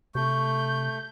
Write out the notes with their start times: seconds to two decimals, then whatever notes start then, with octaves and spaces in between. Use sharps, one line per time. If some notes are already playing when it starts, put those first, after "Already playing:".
0.15 C3 A3 C#6 G6